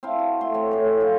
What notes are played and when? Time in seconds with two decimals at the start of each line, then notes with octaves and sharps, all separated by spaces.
0.03 C4 E4 F5 A5
0.19 F#4
0.41 A3 C6
0.54 C4 C#5
0.71 A2 G#4
1.01 F4